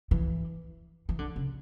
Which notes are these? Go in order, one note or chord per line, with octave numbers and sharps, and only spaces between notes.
E3
E3
D3
C#3